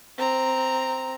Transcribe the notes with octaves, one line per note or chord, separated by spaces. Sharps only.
C4 A#5